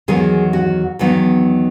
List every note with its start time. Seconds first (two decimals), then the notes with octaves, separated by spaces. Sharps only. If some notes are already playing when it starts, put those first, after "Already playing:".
0.08 E2 D#3 F#3 B3 G#4
0.53 F#4
0.99 E2 D#3 F#3 B3